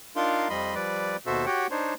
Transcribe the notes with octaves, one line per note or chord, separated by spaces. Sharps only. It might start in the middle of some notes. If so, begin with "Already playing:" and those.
D4 D#4 F4 A#4 F5 C6
F2 F3 G3 D#5 B5 C6
F3 G3 B4 D5
D#2 B2 F#4 A4 C5 E5
F#4 G4 C#5 F#5 G5
D4 D#4 C5 C#5